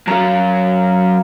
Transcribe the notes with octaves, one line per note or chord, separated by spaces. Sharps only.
F#2 F#3 F5 A#5